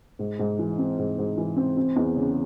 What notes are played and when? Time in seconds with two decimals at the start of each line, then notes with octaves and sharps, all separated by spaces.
0.19 G#2
0.39 G#2
0.59 E3
0.78 C4
0.98 G#2
1.18 G#2
1.37 E3
1.56 C4
1.77 C4
1.96 E2
2.16 C#3